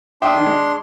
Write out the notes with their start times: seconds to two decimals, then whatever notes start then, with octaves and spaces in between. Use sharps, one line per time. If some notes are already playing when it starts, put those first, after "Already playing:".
0.22 D4 E5 G5 C6 D#6
0.34 D#3
0.46 G#3